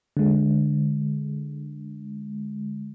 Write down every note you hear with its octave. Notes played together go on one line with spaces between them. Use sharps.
D3 G#3